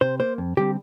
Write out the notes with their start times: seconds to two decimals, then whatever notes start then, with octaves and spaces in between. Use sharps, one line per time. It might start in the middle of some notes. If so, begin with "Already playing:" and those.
0.01 C3 C5
0.20 A#3 C5
0.38 F2
0.57 D3 G3 C4 G4